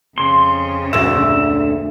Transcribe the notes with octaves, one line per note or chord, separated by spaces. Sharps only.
F2 C#3 C6
D2 A#2 E5